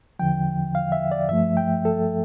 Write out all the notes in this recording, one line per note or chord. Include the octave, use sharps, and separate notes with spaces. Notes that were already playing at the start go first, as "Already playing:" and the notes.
E2 D3 F3 G5
F5
E5
D5
G2 F3 A3 E5
G5
A4